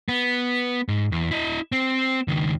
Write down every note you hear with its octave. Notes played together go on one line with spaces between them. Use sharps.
B3
G#2
E2
E4 D#5
C4
C#2 D#3